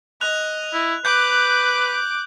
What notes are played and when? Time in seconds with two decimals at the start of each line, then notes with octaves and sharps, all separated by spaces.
0.21 D#5 F#6 F7
0.74 E4
1.05 B4 D6 F#6 G6